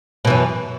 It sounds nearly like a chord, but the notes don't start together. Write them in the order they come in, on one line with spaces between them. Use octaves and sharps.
B2 E3 F#2